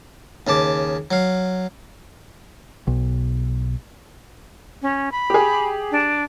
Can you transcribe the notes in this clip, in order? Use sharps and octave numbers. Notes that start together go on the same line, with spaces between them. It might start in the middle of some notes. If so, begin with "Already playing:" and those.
D#2 C#3 A5 D6
F#3 F5
B1
C#4
B5
G4 G#4
D4